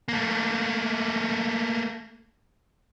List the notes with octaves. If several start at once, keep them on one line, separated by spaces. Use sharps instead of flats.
A3 A#3